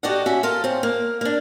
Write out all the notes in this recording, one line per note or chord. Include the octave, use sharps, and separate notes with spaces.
F#4 G4 A4 D5 D#5 F#5
C#4 F#4 E5
F4 A4 A#4
C4 C#4
A#3
A#3 D4